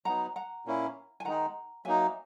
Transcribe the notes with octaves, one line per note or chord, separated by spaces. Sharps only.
F#3 B3 D#4 F#5 A#5
F#5 A#5
A#2 A#3 C#4 E4
G#5
D#3 G#3 D#4 F#5 A#5
F#3 A#3 D#4 E5 G#5